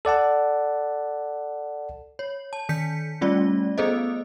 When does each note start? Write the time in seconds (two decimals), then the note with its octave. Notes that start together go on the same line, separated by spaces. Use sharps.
0.05 A4 D5 F#5 A5
2.19 C#5
2.53 A5
2.69 D#3 G6 B6 C#7
3.21 G3 A3 C#4 F4 D5
3.78 B3 G#4 A4 C5 D#5